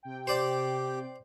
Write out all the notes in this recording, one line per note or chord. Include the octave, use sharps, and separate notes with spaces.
C3 G5
G4 C5 D5